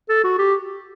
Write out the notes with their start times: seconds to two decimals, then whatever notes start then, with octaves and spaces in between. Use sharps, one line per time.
0.09 A4
0.24 F#4
0.38 G4